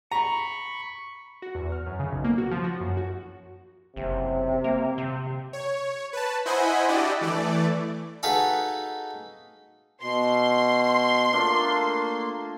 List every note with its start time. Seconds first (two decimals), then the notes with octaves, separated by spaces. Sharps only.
0.11 A#5 B5 C#6
1.42 F#4
1.55 E2
1.72 F6
1.87 F#2
1.99 C#3
2.12 B1
2.24 A#3
2.38 F#4
2.51 F3
2.64 F#4
2.80 F#2
2.97 F#4
3.96 F#1 C3
4.64 A#3
4.98 C3
5.53 C#5
6.13 B4 A5
6.46 E4 C5 D#5 F#5 G#5 B5
6.88 D4 E4 F#4 G4 D5 D#5
7.21 E3 A3 D5
8.23 D#4 F#4 G#4 A4 B4 F5
10.02 B2 C6
11.33 A3 A#3 D4 F4